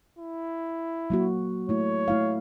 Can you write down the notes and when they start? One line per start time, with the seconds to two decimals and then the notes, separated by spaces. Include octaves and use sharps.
0.19 E4
1.10 F#3 A#3 F#4
1.69 A3 E4 C#5
2.08 A3 E4 F5